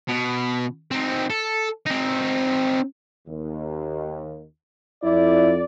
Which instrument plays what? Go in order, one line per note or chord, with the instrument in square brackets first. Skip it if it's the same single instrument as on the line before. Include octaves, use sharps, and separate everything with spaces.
[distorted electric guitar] B2
C4 D#4
A4
C4 D#4
[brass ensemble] D#2
[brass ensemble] F2 D5 [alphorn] E4